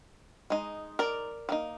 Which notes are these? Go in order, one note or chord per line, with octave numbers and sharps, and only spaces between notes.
G#3 D#4
A#4 D5
G3 A#3 D#4